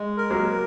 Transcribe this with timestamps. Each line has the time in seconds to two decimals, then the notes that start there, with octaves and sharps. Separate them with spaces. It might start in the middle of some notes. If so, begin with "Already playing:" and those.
Already playing: G#3
0.17 A#4
0.30 F#3 A#3